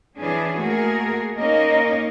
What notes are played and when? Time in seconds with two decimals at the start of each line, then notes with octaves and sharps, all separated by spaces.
0.19 E3 C#4 D4 G#4
0.58 A3 A#3 F#4 G#4 A#4
1.38 A#3 C#4 D#4 A#4 D#5